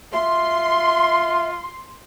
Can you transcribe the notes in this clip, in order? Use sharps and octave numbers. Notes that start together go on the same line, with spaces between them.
F4 E5 C6